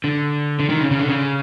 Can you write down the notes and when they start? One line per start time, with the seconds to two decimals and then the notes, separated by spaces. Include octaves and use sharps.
0.04 D3
0.59 D3
0.69 D#3
0.81 C#3
0.91 C#3
0.99 D3
1.08 C#3